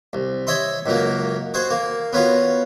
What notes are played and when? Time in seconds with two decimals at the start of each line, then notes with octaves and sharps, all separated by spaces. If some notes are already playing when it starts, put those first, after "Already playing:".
0.13 C2
0.47 C#5 D#5 E5 C6
0.86 C#2 F#2 F#3 A#3
1.54 F#4 G#4 C5
1.70 A#3
2.13 B3 C#4 F4 F#4